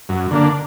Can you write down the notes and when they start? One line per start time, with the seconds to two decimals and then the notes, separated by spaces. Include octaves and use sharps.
0.09 F#2
0.31 D3 A#3 D4